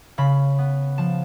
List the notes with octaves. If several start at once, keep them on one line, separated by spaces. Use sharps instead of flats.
C#3 B5
B3
F3 A5